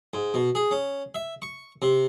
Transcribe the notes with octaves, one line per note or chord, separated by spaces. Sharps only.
G#2
B2
G#4
C#4
E5
C#6
C3